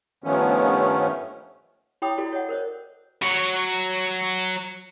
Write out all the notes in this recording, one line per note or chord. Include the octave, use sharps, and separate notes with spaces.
G2 D#3 F3 A3 B3 C#4
E4 C#5 G5 B5 D6 D#6
E4 F#4 A4 D5
C#5 D#5 F#5
A#4 C5 C#5 D#5
F#3 C#5